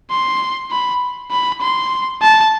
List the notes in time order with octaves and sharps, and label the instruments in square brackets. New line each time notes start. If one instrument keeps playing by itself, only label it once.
[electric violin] C6
B5
B5
C6
A5